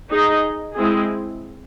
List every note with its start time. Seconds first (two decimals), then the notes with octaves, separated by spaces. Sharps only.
0.10 D#4 G#4 D#5
0.75 G#3 C4 E4 G#4